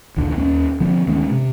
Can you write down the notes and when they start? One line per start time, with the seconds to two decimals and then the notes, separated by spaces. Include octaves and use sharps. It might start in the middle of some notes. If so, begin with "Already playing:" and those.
0.17 A#1 D#2 D3
0.36 D#2 C4 C#4
0.80 D3 F3 C4
1.07 D2 D#3 G#3 C#4
1.31 C3